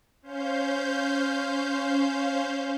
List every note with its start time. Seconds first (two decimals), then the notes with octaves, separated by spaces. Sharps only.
0.22 C#4 C5 F5 G6